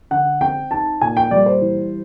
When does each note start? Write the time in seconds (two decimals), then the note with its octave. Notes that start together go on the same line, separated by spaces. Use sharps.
0.11 D3 F#5
0.41 C4 G5
0.71 D#4 A5
1.01 A#2 G#5
1.17 G5
1.31 G3 D5
1.46 C5
1.61 E3